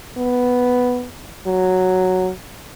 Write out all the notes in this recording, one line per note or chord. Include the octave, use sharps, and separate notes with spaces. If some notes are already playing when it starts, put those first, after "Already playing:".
B3
F#3